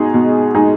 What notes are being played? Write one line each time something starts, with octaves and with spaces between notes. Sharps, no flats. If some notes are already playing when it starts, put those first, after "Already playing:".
Already playing: B2 G#3 D#4 G#4
B2
G#3 D#4 G#4